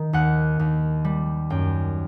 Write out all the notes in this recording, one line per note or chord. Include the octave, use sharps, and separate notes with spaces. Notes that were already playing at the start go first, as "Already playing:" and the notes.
Already playing: D#3
D#2 F#5
D#2
G3
F#2 G5